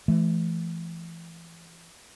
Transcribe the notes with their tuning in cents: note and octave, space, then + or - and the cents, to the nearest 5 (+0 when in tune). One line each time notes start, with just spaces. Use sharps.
E3 +30 A3 -25